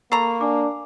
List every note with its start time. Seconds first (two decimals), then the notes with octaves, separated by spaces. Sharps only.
0.12 A#3 A4 A#5 B5 C#6 C7
0.41 D4 G#5 D6